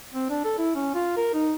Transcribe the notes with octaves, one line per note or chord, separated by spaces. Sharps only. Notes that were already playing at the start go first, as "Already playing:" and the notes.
C4
D4
A4
E4
C#4
F4
A#4
D#4